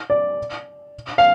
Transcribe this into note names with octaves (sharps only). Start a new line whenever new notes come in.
D5
F5